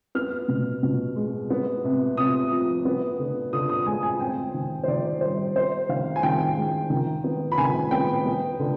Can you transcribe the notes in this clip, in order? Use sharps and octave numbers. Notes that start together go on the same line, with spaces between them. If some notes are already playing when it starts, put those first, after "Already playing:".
B3 F6
B2
B2
G#3
B3
C3
C3 D#6
F3
B3
D3
D3 D#6
D#6
G#3 G#5
G#5
C4 G5
D#3
C5
D#3 D5
G3 C5
B3 C5
D#3 F5
G#5
D#3 G5
G#3
D#3
B3
B5
D#3 G#5
B3 G5
B3
D3